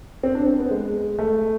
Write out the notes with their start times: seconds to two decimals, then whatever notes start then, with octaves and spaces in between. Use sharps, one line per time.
0.23 C4
0.35 D4
0.46 C4
0.59 B3
0.71 G#3
1.19 A3